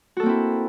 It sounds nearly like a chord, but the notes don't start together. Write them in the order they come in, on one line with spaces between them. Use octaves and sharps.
F#4 A4 A#3 C4 E4